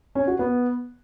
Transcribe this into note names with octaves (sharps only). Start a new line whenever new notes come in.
C#4
F#4
B3